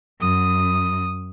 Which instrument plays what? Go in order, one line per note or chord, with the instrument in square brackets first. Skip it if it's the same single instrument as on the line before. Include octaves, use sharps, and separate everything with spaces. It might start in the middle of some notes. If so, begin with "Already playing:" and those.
[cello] F#2 [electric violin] D#6